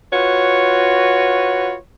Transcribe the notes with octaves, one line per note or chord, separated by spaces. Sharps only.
F4 F#4 B4 C#5